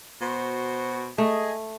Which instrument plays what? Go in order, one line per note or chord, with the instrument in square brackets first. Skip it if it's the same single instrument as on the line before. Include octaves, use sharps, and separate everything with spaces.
[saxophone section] B2 F#4 C5
[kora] A3 [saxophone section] G#4 D#5